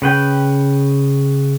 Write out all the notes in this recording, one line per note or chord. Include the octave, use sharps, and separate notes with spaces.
C#3 B4 G5